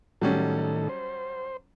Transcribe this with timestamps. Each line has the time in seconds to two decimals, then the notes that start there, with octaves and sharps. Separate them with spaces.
0.22 A2 D#3 F#3 G3 C#4 A4
0.89 C5